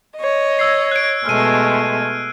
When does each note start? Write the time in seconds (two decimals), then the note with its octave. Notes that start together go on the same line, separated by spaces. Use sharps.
0.17 C#5 D#5
0.59 E6 G#6 C7
0.91 F#6 D7
1.26 B2 G#3 A3 F6 D#7